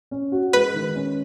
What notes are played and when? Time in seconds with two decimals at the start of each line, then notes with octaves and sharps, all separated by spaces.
0.11 C#4
0.32 F#4
0.53 G#3 B4
0.74 D#3
0.96 C#4